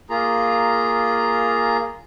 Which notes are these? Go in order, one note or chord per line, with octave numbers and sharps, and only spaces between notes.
A#3 F4 G#4 A#5